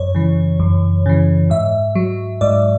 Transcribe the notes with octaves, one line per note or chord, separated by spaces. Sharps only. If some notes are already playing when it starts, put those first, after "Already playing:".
Already playing: F#2 C#5
C#3 E3
F#2
C#3 E3
G#2 E5
F#3
G#2 D5